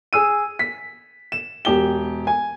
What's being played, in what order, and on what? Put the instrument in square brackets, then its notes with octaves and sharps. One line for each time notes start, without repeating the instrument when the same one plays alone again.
[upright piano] G#4 E6 D#7
B6
E7
E1 G4 G7
G#5